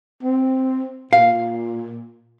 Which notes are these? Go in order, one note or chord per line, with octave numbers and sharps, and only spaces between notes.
C4
A#2 F5